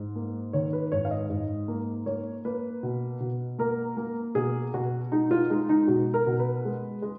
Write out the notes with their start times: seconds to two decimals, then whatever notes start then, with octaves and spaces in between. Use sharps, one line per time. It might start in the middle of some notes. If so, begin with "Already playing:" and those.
Already playing: G#2
0.15 A#3
0.53 D#3 C#5
0.73 B4
0.92 G#2 C#5
1.05 F5
1.11 D#5
1.30 G#2
1.68 A#3
2.06 A#3 C#5
2.45 A#3 B4
2.83 B2
3.20 B2
3.58 A#3 A#4
3.97 A#3
4.35 B2 G#4
4.74 B2 F#4
5.12 G#3 D#4
5.31 F4
5.50 G#3 D#4
5.69 D#4
5.88 B2 F#4
6.14 A#4
6.27 B2
6.39 B4
6.65 G#3
7.02 G#3